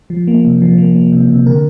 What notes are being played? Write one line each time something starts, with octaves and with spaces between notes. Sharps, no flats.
F3
A#3
C3
F3
A#3
A#3
C3
C3
D3 A#4